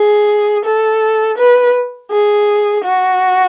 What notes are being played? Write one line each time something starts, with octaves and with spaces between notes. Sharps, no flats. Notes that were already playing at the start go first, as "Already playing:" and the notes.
Already playing: G#4
A4
B4
G#4
F#4